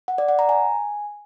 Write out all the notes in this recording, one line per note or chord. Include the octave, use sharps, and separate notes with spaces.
F#5
D5
F#5
A#5
G#5